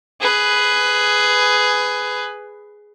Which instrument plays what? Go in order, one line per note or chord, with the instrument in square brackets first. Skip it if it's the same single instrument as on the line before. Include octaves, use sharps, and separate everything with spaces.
[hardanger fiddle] G#4 B4